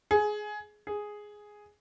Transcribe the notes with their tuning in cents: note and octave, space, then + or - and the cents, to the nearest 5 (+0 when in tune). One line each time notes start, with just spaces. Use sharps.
G#4 +15
G#4 +0